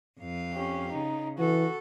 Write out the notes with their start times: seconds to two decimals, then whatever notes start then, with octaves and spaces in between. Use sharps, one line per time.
0.20 F2 F5
0.53 C#4 G4
0.92 C#3 D#4
1.39 E3 F#4 A4